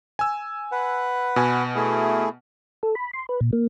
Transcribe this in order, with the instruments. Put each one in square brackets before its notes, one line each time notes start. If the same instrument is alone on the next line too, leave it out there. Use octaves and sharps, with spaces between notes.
[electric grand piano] G#5 E6
[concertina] B4 F#5
[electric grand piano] B2 G#5
[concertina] A3 E4 G#4
[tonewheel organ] A4
B5
C6
B4
A#2
A#3